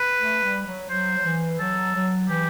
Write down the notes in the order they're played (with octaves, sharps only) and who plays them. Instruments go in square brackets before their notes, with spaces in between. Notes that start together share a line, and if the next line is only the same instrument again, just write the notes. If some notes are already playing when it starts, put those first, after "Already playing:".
Already playing: [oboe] B4
[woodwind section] A3
G3
F#3
[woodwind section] F#3 [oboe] C5
[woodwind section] F#3
E3
[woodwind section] F#3 [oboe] A4
[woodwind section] F#3
[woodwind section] E3 [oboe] G4